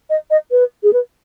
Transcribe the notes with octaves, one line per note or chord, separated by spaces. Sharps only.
D#5
D#5
B4
G#4
B4